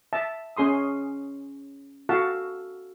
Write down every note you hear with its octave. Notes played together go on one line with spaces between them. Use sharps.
E5 A5
C#4 G#4 C6 D#6
F#4 A4 F5 A5